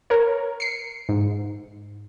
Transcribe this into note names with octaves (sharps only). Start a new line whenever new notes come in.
A#4 C#5
C7 C#7
G#2